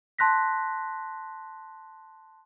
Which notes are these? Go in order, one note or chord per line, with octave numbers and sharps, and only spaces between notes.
A5 C6 F#6 A#6 B6